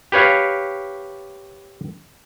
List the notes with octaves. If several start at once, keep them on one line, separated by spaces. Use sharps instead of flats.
G4 B4 C#5 F5